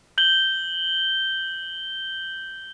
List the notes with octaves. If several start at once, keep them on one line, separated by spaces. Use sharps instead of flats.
G6 F#7 G7